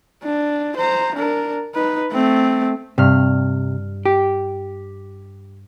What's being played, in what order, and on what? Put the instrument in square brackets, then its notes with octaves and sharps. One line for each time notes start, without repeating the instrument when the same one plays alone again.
[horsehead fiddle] D4
C5 A#5
D4 A#4
D#4 B4
A3 C4
[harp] G2 F6 [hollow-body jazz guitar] C3
[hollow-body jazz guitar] G4